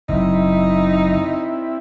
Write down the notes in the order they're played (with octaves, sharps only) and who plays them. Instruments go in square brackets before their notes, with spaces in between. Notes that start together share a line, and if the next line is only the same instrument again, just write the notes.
[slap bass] F#1 [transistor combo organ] C4 E4 E5 [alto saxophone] D#4